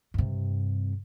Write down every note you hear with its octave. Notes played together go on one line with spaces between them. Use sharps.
G2 C3